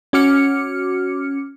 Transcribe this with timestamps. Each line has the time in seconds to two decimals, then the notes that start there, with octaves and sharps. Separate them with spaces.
0.13 C#4 F#4 D6 F6 C#7